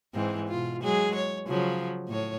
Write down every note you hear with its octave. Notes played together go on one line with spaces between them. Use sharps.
G#2 E3 C4
B2 F4
F#3 G#3 G#4
C#5
C#3 F3 F#3
A2 C#5